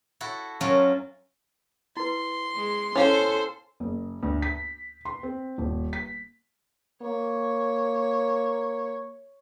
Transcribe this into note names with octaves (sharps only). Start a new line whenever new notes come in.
E4 F#4 A4
F#2 F#3 C#4 F4 F#4 A#4
E4 B4 C6
G#3
C#4 E4 A4 C5 F5
F#1
D2
B6
C6
C4
D#1
B6
A#3 C#5